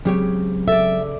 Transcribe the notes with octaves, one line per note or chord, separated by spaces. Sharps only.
C#3 F#3 G#3 C4 G4 C#5
A4 D5 E5